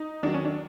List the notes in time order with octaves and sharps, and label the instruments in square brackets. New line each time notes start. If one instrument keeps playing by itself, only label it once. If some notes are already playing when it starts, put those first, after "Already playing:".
Already playing: [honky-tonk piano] D#4
D#3 F#3 D4
C#4
D4